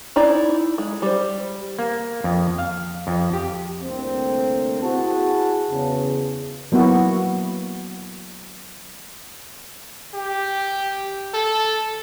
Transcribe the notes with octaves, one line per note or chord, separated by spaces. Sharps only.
D#4 E4 D5
G#3
G3 C5
A#3
F2
F5
F2
G4
C2 D3 A3 A#3 C4
E4 F#4 G#4 A5
E2 C#3
F#3 A#3 B3 E4 F#4
G4
A4